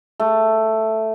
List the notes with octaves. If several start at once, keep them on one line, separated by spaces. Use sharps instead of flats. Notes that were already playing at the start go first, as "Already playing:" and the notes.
A3